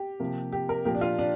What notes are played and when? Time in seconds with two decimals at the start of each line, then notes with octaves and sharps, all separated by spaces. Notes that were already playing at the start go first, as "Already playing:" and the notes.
Already playing: G4
0.20 C3 F3 A#3
0.52 G4
0.69 A#4
0.85 A#2 F3 A#3 G4
0.95 D4
1.01 F4
1.19 D4